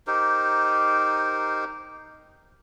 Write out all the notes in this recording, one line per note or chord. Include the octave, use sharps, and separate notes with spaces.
D#4 G4 A#4 C5